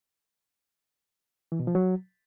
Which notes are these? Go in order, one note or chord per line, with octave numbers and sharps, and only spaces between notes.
E3
B2
F3
F#3